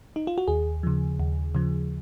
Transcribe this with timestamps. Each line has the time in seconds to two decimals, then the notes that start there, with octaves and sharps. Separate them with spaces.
0.16 D#4
0.27 F4
0.38 F#4
0.48 D#2 G#4
0.83 C#3 F3
1.20 D#2
1.55 C#3 F3